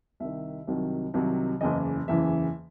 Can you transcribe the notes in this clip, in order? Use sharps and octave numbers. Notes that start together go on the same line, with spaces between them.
C2 C3 D#3 E5
C2 C3 D#3 F#3
C2 C3 D#3 F#3
F#1 E2 C#3 E3 D#5
F#1 E2 C#3 E3 E5